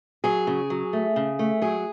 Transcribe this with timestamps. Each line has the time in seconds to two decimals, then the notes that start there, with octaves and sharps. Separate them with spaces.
0.24 F#3 G#4
0.47 C#3
0.70 F#3
0.93 A3
1.16 C#3
1.39 A3
1.62 F#3 G#4